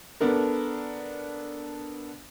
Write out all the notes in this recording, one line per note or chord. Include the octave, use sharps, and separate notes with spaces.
B3 D4 A4 A#4